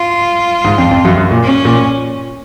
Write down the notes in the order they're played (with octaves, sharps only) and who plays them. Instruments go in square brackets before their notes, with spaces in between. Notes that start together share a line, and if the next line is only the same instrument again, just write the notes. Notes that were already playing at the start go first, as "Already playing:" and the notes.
Already playing: [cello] F4
[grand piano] G#2
F2
F2
F#2
F#2
A#2
[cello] C#4
[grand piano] A#2